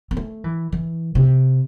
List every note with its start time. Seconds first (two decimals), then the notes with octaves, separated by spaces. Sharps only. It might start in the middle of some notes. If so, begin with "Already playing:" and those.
0.11 C4
0.17 A3
0.44 E3
0.72 E3
1.15 C3